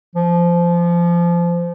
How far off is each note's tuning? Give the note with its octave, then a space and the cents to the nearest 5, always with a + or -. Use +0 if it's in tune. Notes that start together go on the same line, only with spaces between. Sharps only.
F3 -20